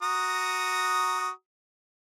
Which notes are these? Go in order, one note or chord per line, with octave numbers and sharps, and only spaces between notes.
F#4 A#5 D#6